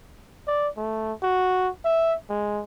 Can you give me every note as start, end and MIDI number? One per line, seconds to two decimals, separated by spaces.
0.48 0.68 74
0.77 1.13 57
1.23 1.69 66
1.85 2.15 76
2.30 2.63 56